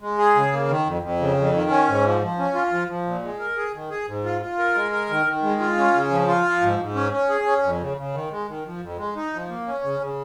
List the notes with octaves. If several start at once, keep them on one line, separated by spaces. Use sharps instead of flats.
G#3
G#4
C#3
A#3
D#3
F2
F2
C#3
F2
D#3
C#4
G#2
F3
F3
C#4
F4
F3
F3
A#2
G#3
A#4
G#4
D#3
G#4
G#2
F4
F4
A#4
G#3
A#4
D#3
D#3
G#3
F4
C#4
C#3
F3
F4
F3
G#2
G#2
C#4
C#4
G#4
C#4
F2
C#3
C#3
D#3
G#3
D#3
F3
F2
G#3
D#4
F3
A#3
C#4
C#3
C#3